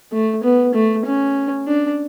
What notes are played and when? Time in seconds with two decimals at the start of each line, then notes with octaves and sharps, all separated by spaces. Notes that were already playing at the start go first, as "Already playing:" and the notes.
0.12 A3
0.44 B3
0.74 A3
1.06 C#4
1.67 D4